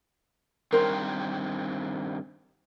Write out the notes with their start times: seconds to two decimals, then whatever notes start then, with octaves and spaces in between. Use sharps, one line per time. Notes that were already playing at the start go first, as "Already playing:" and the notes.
0.72 G2 D#3 C4 A#4 C5 C#5